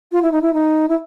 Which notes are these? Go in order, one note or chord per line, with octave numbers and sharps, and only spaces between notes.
F4
E4
D#4
E4
D#4
E4